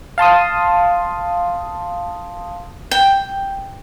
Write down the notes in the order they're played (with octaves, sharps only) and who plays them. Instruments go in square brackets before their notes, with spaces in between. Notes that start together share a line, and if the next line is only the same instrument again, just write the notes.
[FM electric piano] F5 A5 C6 D#6
[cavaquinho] G5